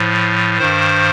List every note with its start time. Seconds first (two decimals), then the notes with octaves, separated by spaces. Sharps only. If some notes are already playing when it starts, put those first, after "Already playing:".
Already playing: A2 F3
0.58 G2 D#3 C5